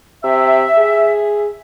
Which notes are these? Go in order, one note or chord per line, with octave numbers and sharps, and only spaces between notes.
C3 E5
G#4